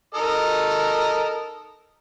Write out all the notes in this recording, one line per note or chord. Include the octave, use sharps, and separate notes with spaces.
A4 A#4 D#5